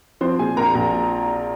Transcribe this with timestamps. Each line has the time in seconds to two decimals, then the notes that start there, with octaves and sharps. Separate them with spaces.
0.21 F3 C4 C5
0.39 A#2 G#4 G#5
0.57 A#1 A#4 A#5
0.75 A#1